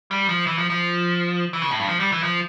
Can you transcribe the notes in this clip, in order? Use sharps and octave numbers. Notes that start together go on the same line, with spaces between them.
G3
F3
E3
F3
F3
E3
C#3
A2
G2
F3
G3
E3
F3